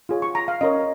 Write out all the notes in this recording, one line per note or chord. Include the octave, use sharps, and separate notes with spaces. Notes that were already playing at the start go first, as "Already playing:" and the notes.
F4 G#4 C#5
C#6
A#5
F5
C#4 A#4 C#5 D#5